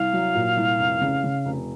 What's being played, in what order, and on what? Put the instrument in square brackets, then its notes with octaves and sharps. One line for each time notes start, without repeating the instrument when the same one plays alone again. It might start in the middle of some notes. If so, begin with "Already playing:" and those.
Already playing: [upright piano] C2 [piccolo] F5
[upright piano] F#3
A#2
C2
F1
C#3
C#3
F1